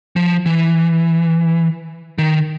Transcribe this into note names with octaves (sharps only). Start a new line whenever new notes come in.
F3
E3
D#3